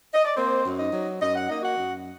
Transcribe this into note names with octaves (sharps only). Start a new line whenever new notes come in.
D#5
D5
A#3 C4 C5
F#2
D#4 D#5
F#3
F#2 D#5
F#5
A#3 D#4 D#5
F#4 F#5
F#2